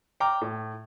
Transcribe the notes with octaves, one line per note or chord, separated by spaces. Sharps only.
G5 A#5 D6 F6
A2